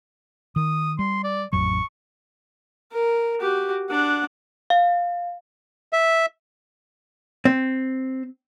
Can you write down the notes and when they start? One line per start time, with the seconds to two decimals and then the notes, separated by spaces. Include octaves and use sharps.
0.56 D#3 D#6
0.99 G3 C6
1.24 D5
1.53 A1 F2 F#3 C#6
2.93 A#4
3.41 F#4 G4
3.90 D4 F#5
4.70 F5
5.93 E5
7.45 C4